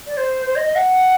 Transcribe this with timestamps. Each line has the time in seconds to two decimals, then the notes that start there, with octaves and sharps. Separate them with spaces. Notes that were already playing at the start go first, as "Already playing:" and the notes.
0.07 D5
0.17 C5
0.46 C5
0.56 D#5
0.66 D#5
0.75 F#5